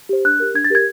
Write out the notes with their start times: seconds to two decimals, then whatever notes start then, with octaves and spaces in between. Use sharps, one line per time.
0.09 G4 C5
0.25 D4 F#6
0.40 G4 A#4
0.54 D4 G#6
0.64 A6
0.70 G4 A#4 G#6